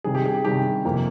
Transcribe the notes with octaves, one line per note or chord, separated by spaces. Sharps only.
C3 D#3 G3 G#4
G4
G#4
G4
C3 D#3 G3 G4
F2 C3 F3 A#3